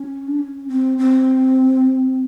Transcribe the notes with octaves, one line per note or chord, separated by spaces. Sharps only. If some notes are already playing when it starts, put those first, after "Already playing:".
Already playing: C#4
D4
C#4
C4
C4